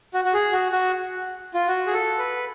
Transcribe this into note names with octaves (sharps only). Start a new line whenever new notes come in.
F#4
F#4
G#4
F#4
F#4
F4
F#4
G#4
A4
B4